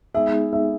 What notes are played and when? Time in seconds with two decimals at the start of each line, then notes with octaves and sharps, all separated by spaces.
0.14 G#3 B3 D#4 G#4 E5
0.53 E5